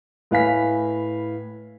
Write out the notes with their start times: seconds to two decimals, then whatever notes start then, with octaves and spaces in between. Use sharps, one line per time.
0.31 A2 B4 F5 G#5 B6